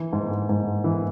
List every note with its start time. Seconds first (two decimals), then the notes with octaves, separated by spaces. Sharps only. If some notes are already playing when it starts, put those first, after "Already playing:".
Already playing: E3
0.13 G#2
0.49 G#2
0.84 E3